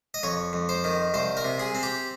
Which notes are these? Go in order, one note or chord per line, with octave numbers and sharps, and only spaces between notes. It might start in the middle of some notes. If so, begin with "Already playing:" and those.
D#5
F2 C#5
F2
C5
D#3
C2 C5
A#4
C3
G#4
C4
G4